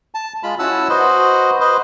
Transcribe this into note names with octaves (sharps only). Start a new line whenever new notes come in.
A5
G#3 F4 B5
C#4 E4 F#4 F#5 A5 E6
F#4 B4 C5 D#5
B4 C5 D#5